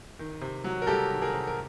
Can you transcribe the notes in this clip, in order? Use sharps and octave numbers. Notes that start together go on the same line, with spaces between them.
D#3
C3
F#3
A#4
C2 G4 A4
D#3
G#4 A#4
C3
A#4